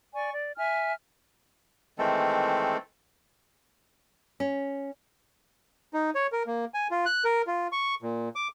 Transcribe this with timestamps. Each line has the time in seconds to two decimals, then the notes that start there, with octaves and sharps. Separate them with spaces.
0.15 D5 G#5 C#6
0.31 D5
0.57 E5 G#5 F6
1.98 D#3 E3 G#3 A3 C4 A4
4.40 C#4
5.94 D#4
6.15 C#5
6.32 A#4
6.47 A#3
6.74 G#5
6.91 F4
7.06 F#6
7.24 A#4
7.47 F4
7.72 C#6
8.02 A#2
8.36 D6